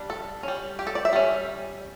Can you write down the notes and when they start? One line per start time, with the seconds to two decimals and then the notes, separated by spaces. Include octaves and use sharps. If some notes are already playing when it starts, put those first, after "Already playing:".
Already playing: G3 D4
0.10 A4
0.43 G3 C#4
0.79 G4
0.87 A4
0.95 D5
1.05 E5
1.13 G3 C#4